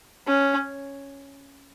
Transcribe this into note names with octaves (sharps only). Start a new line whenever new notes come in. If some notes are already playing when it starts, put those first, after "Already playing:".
C#4